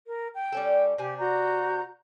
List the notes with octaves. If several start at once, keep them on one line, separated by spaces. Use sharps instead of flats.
A#4
G5
G3 C#4 A4
C3 D4 G4 G#5
F#4 A#5 G6